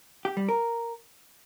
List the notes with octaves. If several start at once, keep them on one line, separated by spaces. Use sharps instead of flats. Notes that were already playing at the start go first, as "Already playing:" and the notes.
G4
G3
A#4